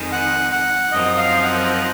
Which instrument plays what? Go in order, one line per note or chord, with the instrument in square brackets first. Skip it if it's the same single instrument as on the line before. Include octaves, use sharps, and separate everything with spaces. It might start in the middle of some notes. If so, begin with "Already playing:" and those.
Already playing: [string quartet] F2 D#3 G#3
[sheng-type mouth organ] F#5
F#5
[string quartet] F#2 F3 C4 D#4 [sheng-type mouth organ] D#5
[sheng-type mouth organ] F5
F#5